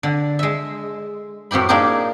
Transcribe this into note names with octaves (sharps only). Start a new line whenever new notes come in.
D3
G#3 E5
F#2 A2 C4 G4 B5
A#3 D4 D#4 G4 G#4